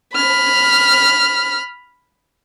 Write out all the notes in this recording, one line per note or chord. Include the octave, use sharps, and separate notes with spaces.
B5 F6